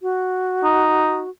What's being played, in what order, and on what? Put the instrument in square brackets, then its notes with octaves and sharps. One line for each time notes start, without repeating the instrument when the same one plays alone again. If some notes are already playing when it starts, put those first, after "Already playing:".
[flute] F#4
[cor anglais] D#4